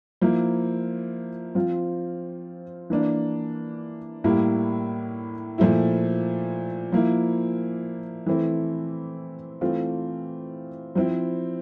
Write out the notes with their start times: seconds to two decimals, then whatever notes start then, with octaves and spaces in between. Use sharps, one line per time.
0.22 F3 A#3 E4
1.55 F3 C4 F4
2.90 E3 A#3 D4
4.24 A2 G3 A#3 E4
5.58 A#2 F3 A3 E4
6.92 F3 A#3 E4
8.26 E3 A3 C4 E4
9.61 E3 A3 C4 F4
10.95 F3 C4 E4